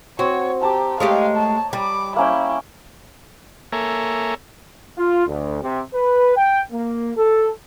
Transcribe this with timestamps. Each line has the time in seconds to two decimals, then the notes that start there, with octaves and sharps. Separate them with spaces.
0.19 C4 F#4 C#5
0.61 G4 D5 A5 A#5
1.00 G#3 A3 G4 C#5 D#5 F5
1.36 A5
1.73 G3 B5 D6
2.16 A#3 C#4 E4 G5
3.72 A#3 A4 C#5 E5 G#5 A#5
4.98 F4
5.27 D2
5.63 C3
5.94 B4
6.36 G5
6.72 A#3
7.17 A4